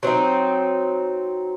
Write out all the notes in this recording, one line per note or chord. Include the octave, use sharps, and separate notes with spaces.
F#3 C4 D#4